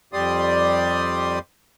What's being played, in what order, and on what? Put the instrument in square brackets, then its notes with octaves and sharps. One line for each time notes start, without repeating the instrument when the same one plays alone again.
[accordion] F2 G3 G4 D5 C6 D#6